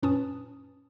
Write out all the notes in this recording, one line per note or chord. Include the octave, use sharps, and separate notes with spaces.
F#2 A#2 C#4 B4 A5 D#6